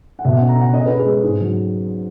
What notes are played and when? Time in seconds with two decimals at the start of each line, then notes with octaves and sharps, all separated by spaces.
0.19 F#5
0.25 B2 E5
0.37 F#5
0.41 C#4
0.49 A#5
0.57 C#4 F#5
0.73 C#4 D#5
0.86 B4
0.90 C#4
0.97 G#4
1.06 G#3
1.23 G#2
1.39 F#3